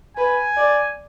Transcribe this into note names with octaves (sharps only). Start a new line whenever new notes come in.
B4 G#5
D5